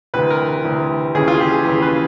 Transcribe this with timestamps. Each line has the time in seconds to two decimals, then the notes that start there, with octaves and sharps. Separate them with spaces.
0.14 D2 C3 E3 B4
0.30 A#4
0.64 D2 C3 E3
1.15 D#2 C#3 E3 G#4
1.28 F4
1.40 G4
1.53 G#4
1.65 D#2 C#3 E3
1.82 B4